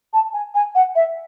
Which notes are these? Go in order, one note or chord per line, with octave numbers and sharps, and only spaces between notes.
A5
G#5
G#5
F#5
E5